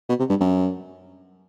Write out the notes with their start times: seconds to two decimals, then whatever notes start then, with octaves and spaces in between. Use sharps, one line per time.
0.09 B2
0.19 C3
0.29 G2
0.41 F#2